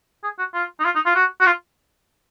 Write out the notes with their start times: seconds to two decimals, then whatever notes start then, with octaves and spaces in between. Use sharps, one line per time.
0.23 G#4
0.38 F#4
0.54 F4
0.80 D#4
0.85 F4
0.95 D#4
1.05 F4
1.15 F#4
1.40 F#4
1.46 F4